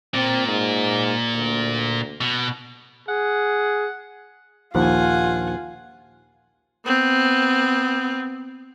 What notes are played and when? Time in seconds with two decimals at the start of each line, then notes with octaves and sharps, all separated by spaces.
0.14 A#2 C4
0.48 G#2
1.34 D2
2.21 B2
3.08 G#4 F#5
4.75 A#1 D#2 F3 F4 F#5 G#5
6.85 B3 C4